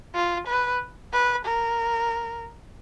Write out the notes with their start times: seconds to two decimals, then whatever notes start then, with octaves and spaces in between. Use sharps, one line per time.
0.15 F4
0.47 B4
1.13 B4
1.45 A#4